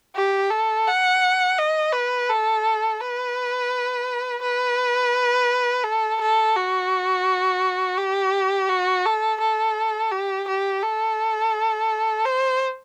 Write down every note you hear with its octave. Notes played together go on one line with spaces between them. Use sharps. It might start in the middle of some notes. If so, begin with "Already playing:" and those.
G4
A4
F#5
D#5
B4
A4
B4
B4
A4
A4
F#4
G4
F#4
A4
A4
G4
G4
A4
C5